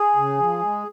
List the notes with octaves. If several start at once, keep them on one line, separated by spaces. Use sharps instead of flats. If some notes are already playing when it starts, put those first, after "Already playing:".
Already playing: G#4
C#3
F3
G#3